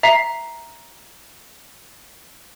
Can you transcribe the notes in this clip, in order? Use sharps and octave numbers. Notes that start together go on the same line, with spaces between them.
E5 A#5 B6 C7